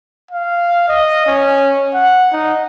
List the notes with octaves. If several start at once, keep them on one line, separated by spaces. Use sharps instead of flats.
F5
D#5
C#4
F#5
D#4